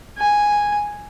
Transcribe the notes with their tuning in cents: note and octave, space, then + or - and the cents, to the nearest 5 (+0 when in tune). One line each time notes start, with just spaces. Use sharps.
G#5 -5